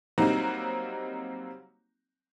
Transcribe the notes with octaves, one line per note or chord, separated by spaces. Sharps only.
F#3 G3 A#3 C4 D#4 F#4